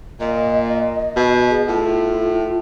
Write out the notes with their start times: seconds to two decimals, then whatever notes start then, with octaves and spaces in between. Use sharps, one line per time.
0.20 A#2 D#5
1.16 B2
1.50 G#4
1.68 A2 F4